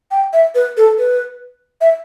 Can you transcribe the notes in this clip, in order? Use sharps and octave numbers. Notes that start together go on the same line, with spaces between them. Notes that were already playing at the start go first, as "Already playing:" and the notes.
G5
E5
B4
A4
B4
E5